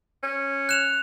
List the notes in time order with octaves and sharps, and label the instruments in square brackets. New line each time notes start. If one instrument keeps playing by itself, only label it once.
[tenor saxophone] C#4
[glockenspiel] F#6 E7 F7